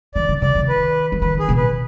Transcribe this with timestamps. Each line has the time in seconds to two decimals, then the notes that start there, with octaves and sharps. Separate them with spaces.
0.15 D#3 D5
0.29 D3
0.42 C3 D5
0.55 D#3
0.69 B4
1.12 F3
1.22 D#3 B4
1.39 G#4
1.49 B2
1.58 B4